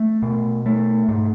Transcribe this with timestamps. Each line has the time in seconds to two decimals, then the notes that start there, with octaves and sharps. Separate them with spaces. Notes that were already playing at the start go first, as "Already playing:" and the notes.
Already playing: A3
0.23 B2
0.66 A3
1.09 G#2